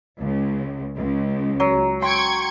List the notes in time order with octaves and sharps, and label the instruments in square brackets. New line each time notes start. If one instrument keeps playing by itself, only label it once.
[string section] C#2
C#2
[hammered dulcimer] F#3
[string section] G5 C#6 G#6 [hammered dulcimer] C6